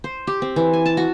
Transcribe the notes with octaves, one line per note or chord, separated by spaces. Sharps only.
C5
G4
C4
E3
G#5
A5
F#4